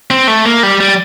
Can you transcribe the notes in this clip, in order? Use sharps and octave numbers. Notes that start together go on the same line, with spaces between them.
C4
A3
A#3
G3
G3